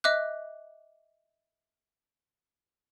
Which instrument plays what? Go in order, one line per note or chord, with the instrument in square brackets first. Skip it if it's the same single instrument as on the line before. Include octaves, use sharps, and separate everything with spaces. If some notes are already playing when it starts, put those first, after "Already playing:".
[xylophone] D#5 E5 D6 F#6